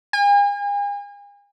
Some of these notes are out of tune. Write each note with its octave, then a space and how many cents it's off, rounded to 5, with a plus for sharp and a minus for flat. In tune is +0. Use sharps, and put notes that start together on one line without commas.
G#5 -40